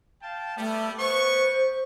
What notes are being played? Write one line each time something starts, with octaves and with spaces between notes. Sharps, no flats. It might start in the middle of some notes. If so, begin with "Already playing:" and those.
F5 G5 A5
G3 A3 B3
B3 C5 C#6